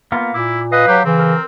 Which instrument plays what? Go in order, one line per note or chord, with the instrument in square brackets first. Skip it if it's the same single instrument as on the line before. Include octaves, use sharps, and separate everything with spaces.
[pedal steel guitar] A#3 B3 F4
[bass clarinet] A#2 [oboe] E4 [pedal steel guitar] D6
[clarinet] B4 [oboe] D#5 [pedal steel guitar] F5
[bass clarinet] F#3 [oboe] G4
[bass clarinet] C#3 [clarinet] E3 [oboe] C4
[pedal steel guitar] A#4